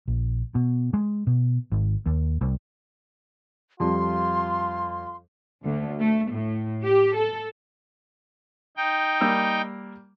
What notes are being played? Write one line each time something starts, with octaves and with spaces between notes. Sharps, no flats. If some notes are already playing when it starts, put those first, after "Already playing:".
A#1
B2
G#3
B2
G#1
D#2
C2
F2 F3 G3 F4 C6
D2
A3
A2
G4
A4
D#4 G5
G3 A#3 E6